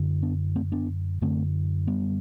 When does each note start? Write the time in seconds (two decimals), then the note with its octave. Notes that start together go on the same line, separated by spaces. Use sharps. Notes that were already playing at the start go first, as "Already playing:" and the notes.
Already playing: F#2 D3
0.22 B3 D4
0.56 A3 C4
0.72 B3 D4
1.21 F#2 D3 A3 C4
1.87 G3 B3